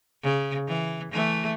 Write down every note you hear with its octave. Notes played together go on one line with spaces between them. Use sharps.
C#3
E3
E3 A3